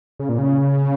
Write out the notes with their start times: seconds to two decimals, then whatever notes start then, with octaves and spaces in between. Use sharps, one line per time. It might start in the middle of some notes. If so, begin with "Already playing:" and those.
0.19 C#3
0.29 A#2
0.38 C#3